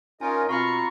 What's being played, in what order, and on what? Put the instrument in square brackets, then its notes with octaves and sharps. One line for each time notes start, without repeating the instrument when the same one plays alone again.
[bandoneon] C#4 D#4 F4 [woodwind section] A#4 D#5 [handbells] G#5
[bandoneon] B2 [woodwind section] C4 F4 A#5 [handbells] F5 B5 F6 [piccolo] C#6